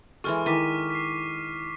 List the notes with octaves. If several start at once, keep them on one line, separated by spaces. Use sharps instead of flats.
E3 G#3 A4 C#6 F6
D#3 E4 D6 B6 D#7
B6 C7